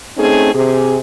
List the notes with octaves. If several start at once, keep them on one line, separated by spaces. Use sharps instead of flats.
A3 C4 C#4 D#4 G#4
C3 G#4